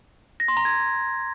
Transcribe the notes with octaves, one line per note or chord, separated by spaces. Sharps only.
A#6
C6
A#5
G#6